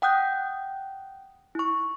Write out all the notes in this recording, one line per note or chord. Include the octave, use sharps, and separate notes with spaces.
F#5 G5 D#6 F#6 G6
E4 C#6